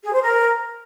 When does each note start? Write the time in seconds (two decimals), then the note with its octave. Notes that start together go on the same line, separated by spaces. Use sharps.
0.05 G#4
0.13 C5
0.22 A#4